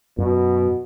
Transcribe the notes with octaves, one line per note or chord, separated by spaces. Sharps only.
F#2 B2